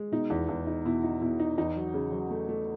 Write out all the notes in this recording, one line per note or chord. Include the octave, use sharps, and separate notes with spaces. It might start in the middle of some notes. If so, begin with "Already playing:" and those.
Already playing: G#3
B2 D#4
E2
E2
D#4
B2 E4
D#4
B2 E4
D#4
E2 D#4
F#3
C#3
F#3
A3
A3